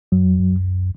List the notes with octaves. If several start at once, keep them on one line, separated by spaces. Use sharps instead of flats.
F#2 F#3
F2
F#2
C2